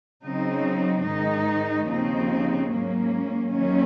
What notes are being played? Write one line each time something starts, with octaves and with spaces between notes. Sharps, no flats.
C#3 F#3 C4 D#4
G#2 D#3 G#3 D#4
D#2 C#3 F3 C4 D#4
G#2 F#3 A#3 C#4
D#2 D#3 F#3 A#3 C#4